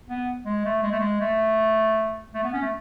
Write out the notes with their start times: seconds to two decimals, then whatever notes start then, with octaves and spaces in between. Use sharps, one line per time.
0.08 B3
0.45 G#3
0.65 A3
0.83 G#3
0.92 A3
1.00 G#3
1.21 A3
2.35 A3
2.44 B3
2.54 C#4
2.62 A3